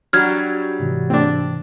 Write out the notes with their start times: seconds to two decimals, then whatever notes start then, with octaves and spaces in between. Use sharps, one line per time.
0.13 F#3 G3 D4 F#4 F6 G#6
0.80 G#2 C3 E3
1.10 C4 D4